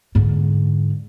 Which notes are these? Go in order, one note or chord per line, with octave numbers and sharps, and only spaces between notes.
G#2 D3